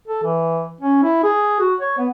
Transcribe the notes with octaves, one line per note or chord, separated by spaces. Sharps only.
A4
E3
C#4
E4
G#4
F#4
C#5
B3